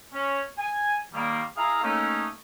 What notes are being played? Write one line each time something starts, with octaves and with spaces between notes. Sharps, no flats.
C#4
G#5
D#3 G3 A#3
E4 G#4 F5 A#5
A3 A#3 C#4 D#4